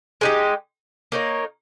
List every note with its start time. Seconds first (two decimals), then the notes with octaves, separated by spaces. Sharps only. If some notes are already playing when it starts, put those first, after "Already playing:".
0.21 G#3 D#4 G4
1.12 A#3 D#4 A#4 C#5